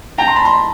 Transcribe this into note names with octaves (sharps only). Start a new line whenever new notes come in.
G5 A5 A#5
C6
A5 B5
A#5 C6